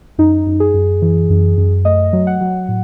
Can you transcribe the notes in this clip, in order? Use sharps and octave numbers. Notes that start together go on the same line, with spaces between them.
F#2 D#4
F#2
G#4
F#2
E3
F#2
F#2
A3 D#5
F#3
F#5
F#3
A2